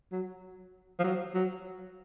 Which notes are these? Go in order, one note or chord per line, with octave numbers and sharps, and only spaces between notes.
F#3
F3
F#3
F#3